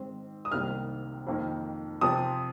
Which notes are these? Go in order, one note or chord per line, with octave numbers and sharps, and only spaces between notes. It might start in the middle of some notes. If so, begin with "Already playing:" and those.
Already playing: G#2 D#3 C4
D#6
C2 C3 D#3 A#3 F6
F2 D#3 A#3
C3 F3 C4 D#6